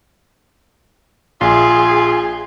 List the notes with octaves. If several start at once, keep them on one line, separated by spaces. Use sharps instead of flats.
A#1 F4 G#4